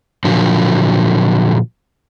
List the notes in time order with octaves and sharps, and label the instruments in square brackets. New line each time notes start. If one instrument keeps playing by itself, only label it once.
[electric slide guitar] A#2 D3 F3 F#3